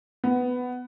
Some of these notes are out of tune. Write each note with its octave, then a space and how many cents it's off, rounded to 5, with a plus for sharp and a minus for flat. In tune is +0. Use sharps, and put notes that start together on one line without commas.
B3 +10